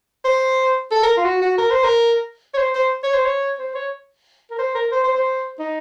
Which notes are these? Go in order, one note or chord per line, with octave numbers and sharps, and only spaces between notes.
C5
A4
A#4
F4
F#4
F#4
A#4
C5
A#4
C#5
C5
C5
C#5
C5
C#5
C5
C#5
A#4
C5
A#4
C5
C5
C5
D#4